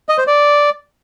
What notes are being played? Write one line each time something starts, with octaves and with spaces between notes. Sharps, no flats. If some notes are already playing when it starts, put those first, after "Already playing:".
D#5
C5
D5